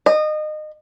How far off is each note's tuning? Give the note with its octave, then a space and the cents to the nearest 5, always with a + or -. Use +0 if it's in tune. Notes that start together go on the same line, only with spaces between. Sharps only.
D#5 -25